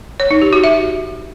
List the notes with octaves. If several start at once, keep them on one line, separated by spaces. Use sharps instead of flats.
C#5
D#4
G4
F#4
E5